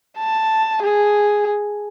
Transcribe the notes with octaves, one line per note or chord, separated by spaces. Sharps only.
A5
G#4